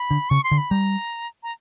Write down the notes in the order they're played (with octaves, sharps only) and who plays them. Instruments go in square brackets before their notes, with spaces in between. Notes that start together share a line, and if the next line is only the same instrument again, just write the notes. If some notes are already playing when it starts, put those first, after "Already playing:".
Already playing: [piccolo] B5
[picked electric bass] D3
[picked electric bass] C#3 [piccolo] C#6
[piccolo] C6
[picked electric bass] D3
[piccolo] B5
[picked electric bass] G3 [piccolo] A#5
[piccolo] A#5